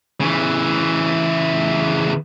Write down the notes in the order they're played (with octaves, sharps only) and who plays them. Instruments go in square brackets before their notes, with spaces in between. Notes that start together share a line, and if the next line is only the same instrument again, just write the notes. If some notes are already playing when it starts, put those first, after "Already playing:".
[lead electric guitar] C#3 E3